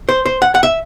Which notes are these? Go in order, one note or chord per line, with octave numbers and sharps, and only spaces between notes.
C5
C5
F#5
F#5
E5